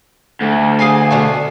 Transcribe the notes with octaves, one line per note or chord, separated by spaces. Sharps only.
D2
G#4 F5 G#5
B2 D3 A3